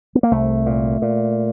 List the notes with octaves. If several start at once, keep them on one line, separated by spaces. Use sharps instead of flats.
B3
A#3
C2 A3
A#2
A#2